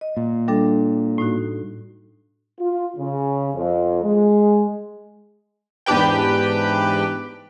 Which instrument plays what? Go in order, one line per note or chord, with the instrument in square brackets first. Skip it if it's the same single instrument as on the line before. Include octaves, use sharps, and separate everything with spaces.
[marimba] D#5
[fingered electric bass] A#2
[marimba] G3 D4 A4
A2 D#4 F#4
[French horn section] F4
C#3
F2
G#3
[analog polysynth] E2 G#2 D4 G4 B4 G5